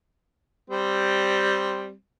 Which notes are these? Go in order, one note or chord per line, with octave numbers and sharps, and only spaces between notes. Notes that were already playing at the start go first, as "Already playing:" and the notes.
G3 C4